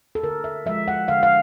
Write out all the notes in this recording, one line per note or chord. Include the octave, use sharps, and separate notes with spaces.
A4
D3 A#4
E5
F3 G#3 E5
F#5
D3 F5
F5